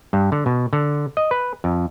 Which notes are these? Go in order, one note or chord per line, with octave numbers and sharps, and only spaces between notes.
G2
D3
B2
D3
D#5
B4
F2